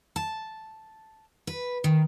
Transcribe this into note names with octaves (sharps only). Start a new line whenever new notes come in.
A5
B4
D#3